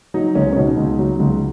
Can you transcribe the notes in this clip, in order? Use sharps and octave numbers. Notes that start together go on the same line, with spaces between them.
F#3 D#4
C#2 C#4
C#4
B2 D#4
C#2
F#3
C#2